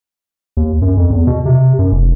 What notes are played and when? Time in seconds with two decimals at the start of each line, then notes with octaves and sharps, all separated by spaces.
0.57 D#2
0.82 F#2
0.97 F2
1.10 E2
1.27 B2
1.45 C3
1.79 F#2
1.92 F1